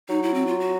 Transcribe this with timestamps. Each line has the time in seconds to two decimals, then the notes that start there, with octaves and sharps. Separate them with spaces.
0.09 F#3 D#4
0.23 E4
0.34 C4
0.47 F4
0.60 F#4